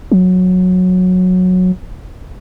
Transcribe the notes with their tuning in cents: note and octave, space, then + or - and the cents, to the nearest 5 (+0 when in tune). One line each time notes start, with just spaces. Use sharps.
F#3 -15